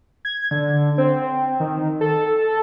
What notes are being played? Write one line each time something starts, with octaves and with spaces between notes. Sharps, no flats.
G#6
D3
C4
D#3
A4